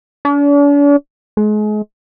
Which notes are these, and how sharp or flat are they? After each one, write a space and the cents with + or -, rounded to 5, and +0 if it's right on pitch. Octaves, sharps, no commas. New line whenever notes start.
D4 -45
G#3 +35